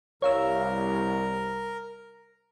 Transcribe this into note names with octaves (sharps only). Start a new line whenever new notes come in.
C2 A#4 C#5 F5 E6